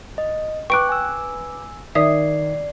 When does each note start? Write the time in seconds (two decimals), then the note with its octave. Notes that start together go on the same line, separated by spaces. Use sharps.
0.18 D#5
0.70 B4 G5 C#6 D6 F#6 D7
0.89 G#5 E6
1.95 D#3 D5 E5 D#6 C7